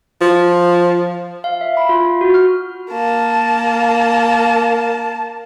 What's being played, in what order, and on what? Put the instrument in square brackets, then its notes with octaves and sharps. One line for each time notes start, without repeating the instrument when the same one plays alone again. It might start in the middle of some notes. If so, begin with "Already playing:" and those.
[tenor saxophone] F3
[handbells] F5
E5
B5
F4
F#4
F6
[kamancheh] A#3 A5